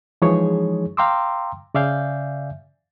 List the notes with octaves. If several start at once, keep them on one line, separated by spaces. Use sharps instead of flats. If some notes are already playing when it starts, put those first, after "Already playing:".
E3 F3 G#3 D#4 G#4 C#5
F5 G5 A#5 C6 D6 E6
C#3 D5 E5 F5 G#5 G6